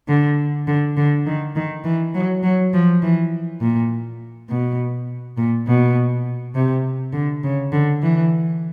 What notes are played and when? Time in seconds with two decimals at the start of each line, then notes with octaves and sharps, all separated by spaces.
0.08 D3
0.67 D3
0.97 D3
1.26 D#3
1.56 D#3
1.84 E3
2.14 F#3
2.43 F#3
2.73 F3
3.02 E3
3.60 A#2
4.49 B2
5.37 A#2
5.67 B2
6.55 C3
7.13 D3
7.43 C#3
7.72 D3
8.02 E3